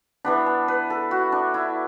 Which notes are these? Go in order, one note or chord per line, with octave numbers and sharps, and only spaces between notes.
E3 B3 D4 B5
A5
B4
A4
F#4
D4
E4